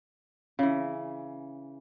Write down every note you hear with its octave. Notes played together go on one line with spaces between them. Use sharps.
C#3 E3